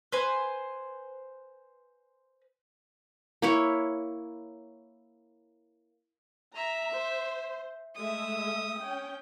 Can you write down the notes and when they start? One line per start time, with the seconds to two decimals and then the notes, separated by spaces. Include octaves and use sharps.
0.12 B4 C5 G#5
3.42 A#3 E4 C#5
6.56 E5 A#5
6.92 C5
7.95 G#3 A3 E5 D#6
8.79 C#4 G5